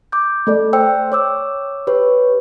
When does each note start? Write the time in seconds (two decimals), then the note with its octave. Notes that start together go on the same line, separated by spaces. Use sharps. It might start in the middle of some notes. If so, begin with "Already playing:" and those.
0.12 D6 G6
0.47 A3 A4 D5
0.73 C5 G5 E6
1.12 C#5 D6 E6
1.87 G4 B4 C#5